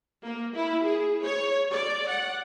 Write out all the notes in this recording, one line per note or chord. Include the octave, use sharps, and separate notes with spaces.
A#3
E4
G#4
C#5
D5
F#5